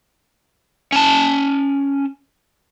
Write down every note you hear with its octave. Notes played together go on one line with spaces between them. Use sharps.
C#4 A5